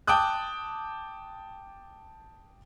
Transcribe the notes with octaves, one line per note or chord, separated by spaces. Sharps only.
G5 A5 D6 D#6 F#6